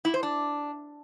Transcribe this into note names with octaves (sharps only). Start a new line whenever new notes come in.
E4
C5
D4